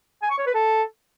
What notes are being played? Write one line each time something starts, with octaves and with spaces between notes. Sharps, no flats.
G#5
C#6
C#5
B4
A4